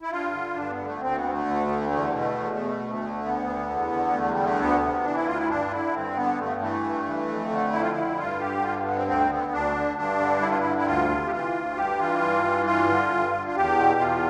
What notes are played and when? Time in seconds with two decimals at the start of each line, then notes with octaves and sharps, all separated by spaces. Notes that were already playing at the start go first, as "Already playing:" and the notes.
0.02 E4
0.11 G2 F4
0.33 D3
0.55 G2 D4
0.70 B3
0.78 D3
0.86 A3
1.01 D2 C4
1.16 B3
1.23 D3
1.30 A3
1.45 D2
1.68 D3
1.90 E2 A3
2.08 G3
2.12 B2 A3
2.35 E2
2.57 B2
2.80 D2
3.02 D3
3.25 D2 B3
3.47 D3
3.70 E2
3.92 D3
4.10 G3
4.14 E2 A3
4.29 G3
4.36 D3
4.44 A3
4.59 D2 B3
4.81 C3
5.04 E3 D4
5.15 E4
5.26 D2 F4
5.37 E4
5.49 G2 D4
5.67 F4
5.71 D3 E4
5.93 G2 C4
6.16 D3 B3
6.38 G2 A3
6.61 E3 A3
6.83 G2
7.06 E3
7.28 F2
7.50 D3
7.73 F2 E4
7.82 F4
7.91 D3 E4
8.18 G2 F4
8.40 D3 G4
8.63 G2 F4
8.85 D3 B3
8.96 C4
9.07 D2 C4
9.30 D3 B3
9.52 D2 D4
9.74 D3
9.97 G2 D4
10.19 D3
10.42 G2 E4
10.50 F4
10.58 E4
10.64 D3
10.77 E4
10.86 D2 F4
11.09 C3
11.27 G4
11.32 E3 F4
11.54 D2
11.76 G2 G4
11.98 E3 F4
12.21 G2
12.44 E3
12.66 G2 F4
12.89 D3
13.11 G2
13.33 D3
13.47 F4
13.56 E2 G4
13.78 B2
14.00 E2 F4